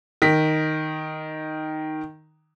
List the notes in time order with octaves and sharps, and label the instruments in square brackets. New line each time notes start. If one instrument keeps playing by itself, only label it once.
[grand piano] D#3 B6